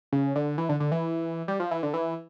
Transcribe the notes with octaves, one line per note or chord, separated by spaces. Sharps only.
C#3
D3
E3
D3
D3
E3
G3
F3
E3
D3
E3